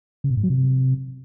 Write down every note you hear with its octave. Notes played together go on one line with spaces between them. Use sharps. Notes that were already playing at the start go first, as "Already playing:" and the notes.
C#3
B2
G#2
F#3
C3